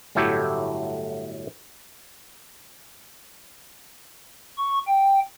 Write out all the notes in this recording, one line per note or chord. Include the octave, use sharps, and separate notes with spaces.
G1 A2 F#3 A3 E4 G4
C#6
G5